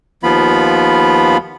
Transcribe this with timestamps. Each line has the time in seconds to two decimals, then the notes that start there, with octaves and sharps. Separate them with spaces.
0.23 D#2 F3 B3 F4 B5